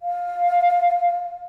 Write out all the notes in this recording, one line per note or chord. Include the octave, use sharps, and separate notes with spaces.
F5